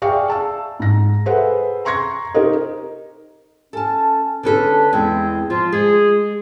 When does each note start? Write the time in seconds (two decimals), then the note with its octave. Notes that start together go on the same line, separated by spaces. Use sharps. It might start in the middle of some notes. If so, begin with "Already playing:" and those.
0.02 G#4 D5 E5 F5 G5 C#6
0.30 A5 E6
0.80 G#2 A#6
1.26 G#4 A4 B4 C5 E5 F#5
1.85 A#5 C6 C#6 G#6 A#6
2.35 D#4 G4 A#4 C5 D#5
3.73 C#4 A4 A5
4.43 D3 C#4 A4 B4
4.93 E2 G#3 C4
5.50 F3 F4
5.72 G#3 G#4